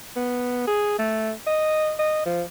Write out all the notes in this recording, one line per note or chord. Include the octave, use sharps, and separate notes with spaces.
B3
G#4
A3
D#5
D#5
F3